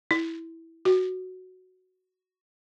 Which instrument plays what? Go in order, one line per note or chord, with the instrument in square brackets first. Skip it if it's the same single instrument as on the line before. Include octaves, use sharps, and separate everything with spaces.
[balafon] E4
F#4